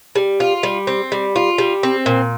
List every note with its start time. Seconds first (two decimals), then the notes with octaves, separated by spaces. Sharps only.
0.15 G3
0.40 F4
0.63 G3
0.87 C4
1.12 G3
1.36 F4
1.58 G3
1.83 C4
2.06 A#2